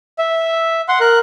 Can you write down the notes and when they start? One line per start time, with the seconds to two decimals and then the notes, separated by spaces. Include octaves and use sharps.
0.18 E5
0.89 F#5 C6
1.00 A#4 F#6